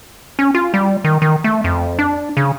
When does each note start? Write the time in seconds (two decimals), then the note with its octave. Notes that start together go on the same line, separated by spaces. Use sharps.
0.39 C#4
0.55 F4
0.74 G3
1.04 D#3
1.22 D#3
1.44 A3
1.64 F2
1.99 D4
2.37 C#3